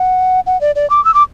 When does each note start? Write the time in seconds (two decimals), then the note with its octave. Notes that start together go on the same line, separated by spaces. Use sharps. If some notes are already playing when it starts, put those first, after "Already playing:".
Already playing: F#5
0.47 F#5
0.61 D5
0.76 D5
0.90 D6
1.05 E6
1.14 D6